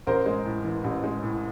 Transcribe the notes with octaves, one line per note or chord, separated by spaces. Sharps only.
A1 A#4 C5
G#3
A2
E3
A1
G#3
A2